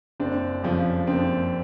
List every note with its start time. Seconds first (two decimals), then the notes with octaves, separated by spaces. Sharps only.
0.20 F#1 C4 D4
0.63 F2 C#3 F3
1.07 F#1 C4 D4